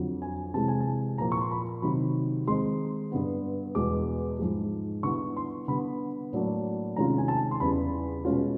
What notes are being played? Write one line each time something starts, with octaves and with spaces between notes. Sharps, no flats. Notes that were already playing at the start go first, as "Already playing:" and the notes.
Already playing: F2 D3 F#3
G#5
C3 E3 G#3 A5
G#5
A5
A#2 F3 A#3 A#5
C#6
C6
B5
C3 D#3 F#3 B5
D#3 G#3 C4 D#4 C6
G2 D3 G3 B3
E2 B2 G#3 D6
G#2 F3 G#3
D3 G3 B3 E4 C#6
C6
D3 G3 B3 B5
A2 F#3 A#3 D4
C3 D#3 G#3 C#4 F4 A#5
G#5
A5
C6
E2 C#3 E3 G3 B5
B2 G#3 C#4 F4